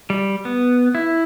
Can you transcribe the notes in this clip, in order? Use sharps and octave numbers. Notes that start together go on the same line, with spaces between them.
G3
B3
E4